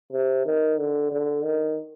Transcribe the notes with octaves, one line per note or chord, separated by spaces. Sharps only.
C3
D#3
D3
D3
D#3